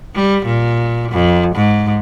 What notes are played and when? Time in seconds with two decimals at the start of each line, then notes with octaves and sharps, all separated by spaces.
0.15 G3
0.45 A#2
1.11 F2
1.55 G#2